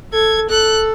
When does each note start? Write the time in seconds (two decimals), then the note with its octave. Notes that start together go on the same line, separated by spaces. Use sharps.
0.13 A4 G#6
0.50 A4 F#6